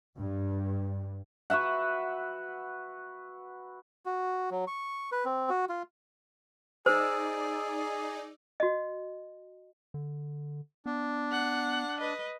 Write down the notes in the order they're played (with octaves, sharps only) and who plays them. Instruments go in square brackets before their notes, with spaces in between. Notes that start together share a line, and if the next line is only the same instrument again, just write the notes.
[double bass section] G2
[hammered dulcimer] F#4 B4 E5 F#5
[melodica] F#4
F#3
C#6
B4
C4
F#4
F4
[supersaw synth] D#4 D5 [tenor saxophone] G#4 [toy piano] C5 [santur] E6
[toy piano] F#4 D#5
[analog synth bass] D3
[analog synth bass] B3 [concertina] D4
[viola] F#5
B4 D#5